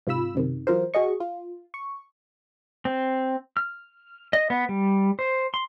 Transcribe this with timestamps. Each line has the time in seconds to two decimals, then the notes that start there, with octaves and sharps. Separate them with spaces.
0.07 G#2 C3 F4 B5 E6
0.35 F#2 C3 D#3
0.67 E3 F#3 F4 A#4 C5
0.94 F#4 G#4 D#5 C#6
1.20 F4
1.74 C#6
2.85 C4
3.57 F6
4.33 D#5
4.50 B3
4.69 G3
5.19 C5
5.54 C6